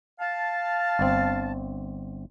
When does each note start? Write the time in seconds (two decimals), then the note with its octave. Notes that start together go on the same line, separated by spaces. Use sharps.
0.20 F5 A5
0.99 G1 C4